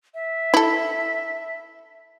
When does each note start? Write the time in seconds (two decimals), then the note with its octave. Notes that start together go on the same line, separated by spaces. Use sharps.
0.14 E5
0.54 E4 A4